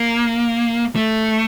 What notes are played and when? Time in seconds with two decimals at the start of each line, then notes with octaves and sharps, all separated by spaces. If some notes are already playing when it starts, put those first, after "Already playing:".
Already playing: A#3
0.96 A3